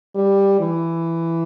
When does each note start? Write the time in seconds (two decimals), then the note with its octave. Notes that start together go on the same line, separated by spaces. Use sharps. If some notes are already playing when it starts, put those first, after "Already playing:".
0.15 G3
0.60 E3